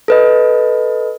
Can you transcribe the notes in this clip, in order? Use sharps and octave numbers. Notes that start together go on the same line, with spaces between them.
A4 B4 D#5